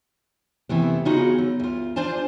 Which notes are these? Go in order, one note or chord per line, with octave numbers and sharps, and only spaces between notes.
C3 E3 A3 B3
C#3 B3 D#4 F4 F#4 G#4
F#3
D2 F4
D4 F4 C5 D5 G#5 A5